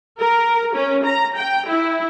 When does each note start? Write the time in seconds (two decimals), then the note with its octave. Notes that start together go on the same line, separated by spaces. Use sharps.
0.20 A#4
0.74 C#4
1.04 A#5
1.37 G5
1.68 E4